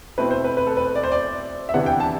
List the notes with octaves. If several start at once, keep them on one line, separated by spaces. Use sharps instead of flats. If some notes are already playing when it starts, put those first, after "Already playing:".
B2 A3 C4 E4 B4
C5
B4
B4
A4
B4
D5
C5
D5
E5
C3 E3 B3 D4 F#5
G5
A5